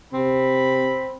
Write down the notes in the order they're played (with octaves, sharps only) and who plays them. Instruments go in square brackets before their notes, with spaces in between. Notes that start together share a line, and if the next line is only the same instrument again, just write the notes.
[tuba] C3 [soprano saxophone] C4 [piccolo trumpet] B5